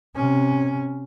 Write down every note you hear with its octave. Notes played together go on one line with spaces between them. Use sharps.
C3 C#4